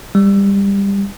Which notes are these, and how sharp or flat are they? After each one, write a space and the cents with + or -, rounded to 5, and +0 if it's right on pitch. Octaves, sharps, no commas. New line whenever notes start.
G3 +20